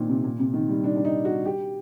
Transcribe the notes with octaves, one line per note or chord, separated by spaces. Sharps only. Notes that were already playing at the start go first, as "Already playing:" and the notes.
Already playing: A#2 D#3 C4 D4
C3
A#2
C3
D#3
G3
D4
D4
D#4
F#4
G4